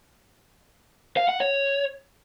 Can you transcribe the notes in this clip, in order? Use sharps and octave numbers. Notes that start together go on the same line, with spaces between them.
F5
F#5
C#5